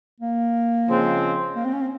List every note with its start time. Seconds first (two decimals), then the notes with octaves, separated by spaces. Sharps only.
0.20 A#3
0.89 C#3 F3 G#3 C4
1.56 A#3
1.65 C4
1.73 C#4
1.81 C4